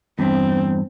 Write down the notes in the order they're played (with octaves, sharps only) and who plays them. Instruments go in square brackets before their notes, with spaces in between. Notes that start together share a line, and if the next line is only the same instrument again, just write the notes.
[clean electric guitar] E2 G2 [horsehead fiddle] C4